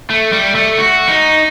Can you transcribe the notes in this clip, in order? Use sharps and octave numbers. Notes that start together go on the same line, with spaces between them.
A3
G3
A3
F#4
D#4